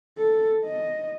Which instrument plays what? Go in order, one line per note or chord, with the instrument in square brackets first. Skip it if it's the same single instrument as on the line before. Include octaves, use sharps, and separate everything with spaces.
[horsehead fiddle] A4
D#5